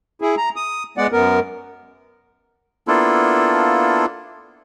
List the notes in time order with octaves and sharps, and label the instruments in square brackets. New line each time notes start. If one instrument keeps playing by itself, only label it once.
[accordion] E4 G#4
A#5
D#6
G#3 B3 D5 F#5
F#2 B3 A#4
[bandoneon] A#3 B3 D4 E4 F4 A4